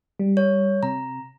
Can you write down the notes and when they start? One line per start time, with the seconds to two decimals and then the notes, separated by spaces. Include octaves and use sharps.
0.19 G3
0.37 C#5
0.83 C3 A#5